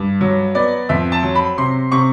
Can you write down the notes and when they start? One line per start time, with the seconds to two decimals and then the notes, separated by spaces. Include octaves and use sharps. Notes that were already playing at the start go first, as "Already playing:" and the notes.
Already playing: G2
0.21 F#3
0.55 B3 D5
0.89 F2 E5
1.12 A5
1.23 F#3
1.35 B5
1.58 C3 C6
1.92 C3 C#6